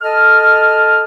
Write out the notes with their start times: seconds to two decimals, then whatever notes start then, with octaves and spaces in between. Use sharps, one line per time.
0.02 A4 D#5 A5 F6